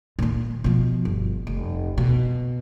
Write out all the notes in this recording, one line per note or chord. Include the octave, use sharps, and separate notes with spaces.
A#2 D#3
B2 F3
G1
F1
B2